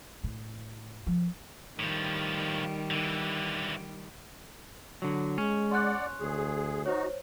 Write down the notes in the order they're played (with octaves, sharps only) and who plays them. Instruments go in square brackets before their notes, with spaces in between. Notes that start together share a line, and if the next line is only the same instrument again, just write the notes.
[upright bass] A2
F3
[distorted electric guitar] A2 F3 [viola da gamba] D#3 G3
[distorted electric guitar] D3 E3
[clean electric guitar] D3 F#3
[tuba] G#3 [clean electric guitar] C#4
[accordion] D5 F#5 [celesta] C6 F#6
[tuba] D2 [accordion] G#4
[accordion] D#4 F#4 [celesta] C5 C#5